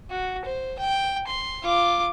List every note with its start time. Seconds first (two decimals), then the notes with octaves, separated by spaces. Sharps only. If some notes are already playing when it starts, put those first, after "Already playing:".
0.10 F#4
0.45 C5
0.79 G5
1.27 C6
1.63 F4 D6